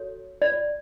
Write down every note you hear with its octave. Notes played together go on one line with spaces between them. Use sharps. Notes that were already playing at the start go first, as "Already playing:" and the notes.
Already playing: F#4 A4 C#5
D5